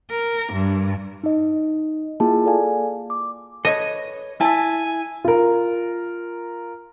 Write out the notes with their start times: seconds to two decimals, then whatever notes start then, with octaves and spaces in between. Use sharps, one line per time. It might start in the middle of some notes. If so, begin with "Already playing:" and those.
0.10 A#4
0.52 G2
1.24 D#4 D#5
2.20 A#3 E4 F4 G#4 G5 A5
2.45 A4 D5 F5 G#5
3.10 D6
3.65 A4 B4 C#5 D#5
4.41 E4 E5 G#5 A5
5.24 F4 A#4